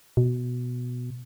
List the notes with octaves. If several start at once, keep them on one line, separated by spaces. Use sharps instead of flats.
B2